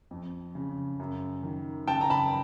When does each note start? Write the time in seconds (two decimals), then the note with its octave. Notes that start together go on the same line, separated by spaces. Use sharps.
0.11 F2
0.55 C#3
1.00 F#2
1.43 D#3
1.87 C#3 G5 A5
2.01 A#5
2.10 A5 B5